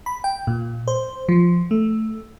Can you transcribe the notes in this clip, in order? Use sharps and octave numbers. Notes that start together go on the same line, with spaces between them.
B5
G5
A#2
C5
F3
A3